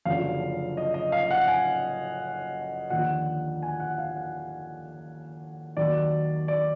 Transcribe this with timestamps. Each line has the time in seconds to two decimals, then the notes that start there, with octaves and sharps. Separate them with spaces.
0.05 F#1 F#2 D3 F3 F5
0.77 D#5
0.94 D#5
1.12 F5
1.31 F#5
1.48 G#5
2.90 D#2 D3 F3 F#5
3.63 G#5
3.80 F#5
3.98 F5
4.16 F#5
5.77 D#2 D#3 F#3 D5
6.48 D5